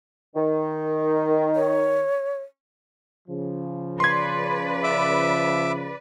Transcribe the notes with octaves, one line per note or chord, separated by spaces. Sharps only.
D#3
C#5
C#3 F3
B4 D5 C6 G#6
E5 D6